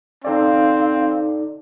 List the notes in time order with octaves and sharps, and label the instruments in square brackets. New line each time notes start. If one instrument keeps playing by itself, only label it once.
[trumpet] C4 [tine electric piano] D#4 A4 D5 [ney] F5